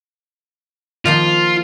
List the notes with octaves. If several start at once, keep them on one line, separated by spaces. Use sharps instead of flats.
D#3 F3 A#3 F4